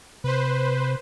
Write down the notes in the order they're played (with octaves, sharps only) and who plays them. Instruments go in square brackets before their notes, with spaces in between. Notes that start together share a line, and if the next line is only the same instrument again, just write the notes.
[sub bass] C3 [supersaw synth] B4 C5